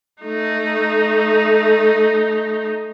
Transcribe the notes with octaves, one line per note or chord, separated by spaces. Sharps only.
A3 D#4